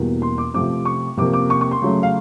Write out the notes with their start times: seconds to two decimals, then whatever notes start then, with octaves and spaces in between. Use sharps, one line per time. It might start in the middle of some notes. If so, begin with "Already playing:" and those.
Already playing: E2 B2 G3 A#3
0.22 C6
0.38 D6
0.54 C3 F3 A3 C4 D6
0.85 C#6
1.17 C3 F3 A#3 D6
1.34 D6
1.50 C#6
1.61 C#6
1.71 C6
1.82 C#3 F#3 A3
2.03 F5